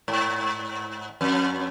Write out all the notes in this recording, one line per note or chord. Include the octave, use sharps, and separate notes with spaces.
G#2
F2